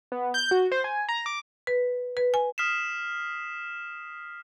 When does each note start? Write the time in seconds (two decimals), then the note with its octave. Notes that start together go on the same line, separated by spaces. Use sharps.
0.12 B3
0.34 G6
0.51 F#4
0.72 C5
0.84 G#5
1.09 A#5
1.26 D6
1.67 B4
2.17 B4
2.34 G#5
2.58 D#6 F6 B6 C7 E7